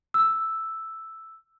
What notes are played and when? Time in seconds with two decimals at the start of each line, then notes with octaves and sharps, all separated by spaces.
0.14 E6